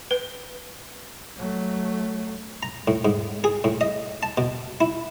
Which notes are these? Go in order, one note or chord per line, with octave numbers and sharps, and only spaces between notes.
B4
F#3 A3
A#5
A2
G#2
G#4
A2
D#5
A5
B2
E4